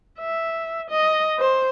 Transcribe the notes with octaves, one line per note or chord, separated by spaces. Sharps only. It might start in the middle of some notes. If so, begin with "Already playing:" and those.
E5
D#5
C5